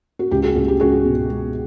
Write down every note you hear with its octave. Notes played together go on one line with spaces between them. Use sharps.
F#4
C#2 G4
F#4 G#4
C#2 F#4
G4
C#2 F#4 G#4
B2
G#3